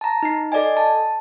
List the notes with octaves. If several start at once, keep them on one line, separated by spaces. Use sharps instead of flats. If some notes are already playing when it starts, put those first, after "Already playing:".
A5 A#5
D#4 C7
A4 D5 D#5 G#5
A5